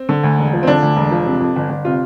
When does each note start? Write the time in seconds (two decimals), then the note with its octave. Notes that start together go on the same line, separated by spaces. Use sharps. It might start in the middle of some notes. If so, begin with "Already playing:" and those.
Already playing: C4
0.09 D3
0.23 D2
0.39 E1
0.53 F3
0.63 C4
0.67 D3 D4
0.82 D2
0.97 E1
1.11 F3
1.26 C3
1.40 F2
1.56 G1
1.70 G1
1.85 C3 F4